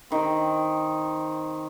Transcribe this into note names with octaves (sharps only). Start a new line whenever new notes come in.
D#3 C4